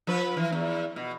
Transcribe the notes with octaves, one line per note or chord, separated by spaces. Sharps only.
F3 B4
E3
E2
B2